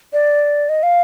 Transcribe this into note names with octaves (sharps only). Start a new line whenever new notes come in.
D5
D#5
F5